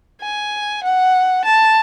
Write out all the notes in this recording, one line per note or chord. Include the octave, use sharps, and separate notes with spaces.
G#5
F#5
A5